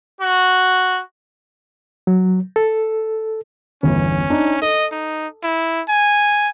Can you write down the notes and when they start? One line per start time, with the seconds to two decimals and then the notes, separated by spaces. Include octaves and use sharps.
0.21 F#4
2.07 F#3
2.56 A4
3.83 G1 E2 C#4
4.30 D4 D#4
4.62 A4 D#5
4.92 D#4
5.43 E4
5.88 G#5